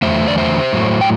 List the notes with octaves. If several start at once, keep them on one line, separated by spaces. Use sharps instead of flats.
E2 D3 F#3 A3 C5 E5
D5
C5 E5
A2 F#3 A3
G5